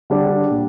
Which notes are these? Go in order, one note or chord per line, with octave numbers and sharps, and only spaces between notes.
D3 G3 D4 G4
A#2